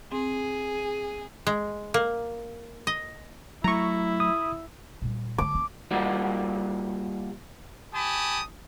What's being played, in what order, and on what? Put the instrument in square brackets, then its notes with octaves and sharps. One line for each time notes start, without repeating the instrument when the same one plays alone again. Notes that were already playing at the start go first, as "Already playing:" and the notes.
[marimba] C4 [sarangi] G#4
[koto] G#3
A#3
D#5
[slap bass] F#3 A3 [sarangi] E4 [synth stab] A#5 C#6
[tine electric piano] D#6
[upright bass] A#2 G3
[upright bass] D3 G#3 [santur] D6
[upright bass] C4
[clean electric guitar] G3 A#3 F4 F#4 D5
[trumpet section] G4 G#5 A5 B5 D#6